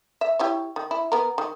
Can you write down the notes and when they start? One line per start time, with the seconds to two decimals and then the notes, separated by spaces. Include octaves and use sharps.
0.21 E5
0.39 E4 G4 C#5
0.76 D#3
0.91 E4
1.12 B3 A#4
1.38 D#3